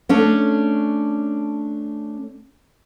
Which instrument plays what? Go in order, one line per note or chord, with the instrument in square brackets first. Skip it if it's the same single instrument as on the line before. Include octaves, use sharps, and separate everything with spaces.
[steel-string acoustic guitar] A3 C#4 D4